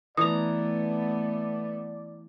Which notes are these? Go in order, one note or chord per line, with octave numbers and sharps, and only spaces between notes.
E3 A3 B3 D5 A#5 D#6